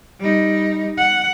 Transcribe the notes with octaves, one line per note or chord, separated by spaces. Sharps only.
G3 D#4
F#5